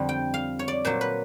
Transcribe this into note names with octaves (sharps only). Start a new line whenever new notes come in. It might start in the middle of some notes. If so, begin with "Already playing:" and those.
Already playing: F2 D3 G3
G5
F5
C#5
D5
A#2 F#3 C5
B4